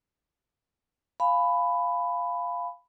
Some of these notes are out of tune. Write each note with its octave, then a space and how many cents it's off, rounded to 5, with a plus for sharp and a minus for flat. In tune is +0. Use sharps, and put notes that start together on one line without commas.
F5 +0 G#5 +0 B5 +10